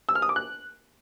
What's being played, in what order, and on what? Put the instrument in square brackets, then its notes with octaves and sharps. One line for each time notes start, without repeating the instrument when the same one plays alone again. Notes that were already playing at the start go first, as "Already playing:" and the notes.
[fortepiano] E6
F6
D#6
D6
F#6